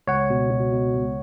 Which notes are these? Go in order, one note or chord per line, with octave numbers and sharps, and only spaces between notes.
C#2 C#5 F#5
B2
B2
B2
C#2